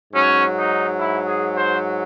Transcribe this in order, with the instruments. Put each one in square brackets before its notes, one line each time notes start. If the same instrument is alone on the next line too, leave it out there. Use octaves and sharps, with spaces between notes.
[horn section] G#2 F#3 C#4
D#4
E4
G#4
C5